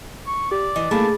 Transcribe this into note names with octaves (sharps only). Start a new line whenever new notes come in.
C#6
G4 D5
E3 D#5
A3 A#3 D4 G#4 A5 B5 D6